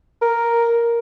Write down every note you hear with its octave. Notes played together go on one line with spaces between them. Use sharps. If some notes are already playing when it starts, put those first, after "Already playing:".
A#4